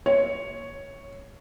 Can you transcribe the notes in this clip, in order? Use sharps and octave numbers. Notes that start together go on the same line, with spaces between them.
C#5